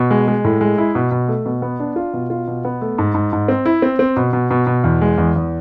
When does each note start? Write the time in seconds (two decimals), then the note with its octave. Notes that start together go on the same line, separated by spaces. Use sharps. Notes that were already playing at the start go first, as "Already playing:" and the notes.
Already playing: B2
0.11 G#3
0.28 G#3
0.44 A2
0.61 G#3
0.78 E4
0.95 B2
1.11 B2
1.28 A3
1.46 B2
1.62 B3
1.80 D4
1.96 F4
2.13 B2
2.30 F4
2.48 B2
2.65 B3
2.81 A3
2.98 G#2
3.14 G#2
3.33 G#2
3.48 C4
3.65 E4
3.82 C4
3.99 C4
4.17 B2
4.33 B2
4.51 B2
4.67 B2
4.84 E2
5.02 G#3
5.18 E2
5.35 E2